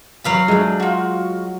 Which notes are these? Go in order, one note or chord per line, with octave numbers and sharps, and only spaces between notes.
F#3 F5 B5
G#3 A3 D4
F4 F#4